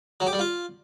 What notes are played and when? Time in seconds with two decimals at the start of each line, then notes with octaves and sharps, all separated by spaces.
0.20 F#3
0.27 G4
0.33 G3
0.39 F4